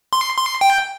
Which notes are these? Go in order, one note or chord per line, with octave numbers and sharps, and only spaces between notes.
C6
C6
G5